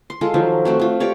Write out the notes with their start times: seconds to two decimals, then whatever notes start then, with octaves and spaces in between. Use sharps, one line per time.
0.10 C6
0.21 G#3 F4 A4
0.34 D#3 F3 F#3
0.65 A3 C4 F#4
0.80 A3 F4
1.00 G4 C#5 D5 F5